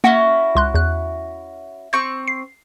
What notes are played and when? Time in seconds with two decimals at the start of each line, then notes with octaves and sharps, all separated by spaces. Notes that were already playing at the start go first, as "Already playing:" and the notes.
0.04 A#3 C#4 E4 F#4 F#5
0.55 C#2 C6 F#6
0.74 E2 F#6
1.93 C4 C#6 G6
2.28 C7